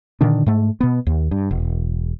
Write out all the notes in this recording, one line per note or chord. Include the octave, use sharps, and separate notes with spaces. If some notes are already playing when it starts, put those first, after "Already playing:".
A#2 D3 D#3 D4
G#2 A3
B2 B3
D#2
G2
E1